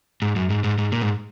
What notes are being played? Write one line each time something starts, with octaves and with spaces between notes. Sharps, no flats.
G#2
F#2
G#2
G#2
G#2
A#2
G#2